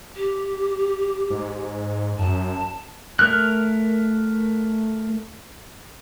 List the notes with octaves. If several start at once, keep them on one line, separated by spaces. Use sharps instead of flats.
G4
G#2
F#2 A5
A3 A#4 F6 F#6